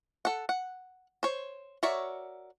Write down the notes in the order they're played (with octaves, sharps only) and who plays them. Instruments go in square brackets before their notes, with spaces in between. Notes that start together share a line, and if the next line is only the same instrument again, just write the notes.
[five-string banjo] A4 F#5
F#5
C5 C#5
F#4 A#4 C#5 D5 E5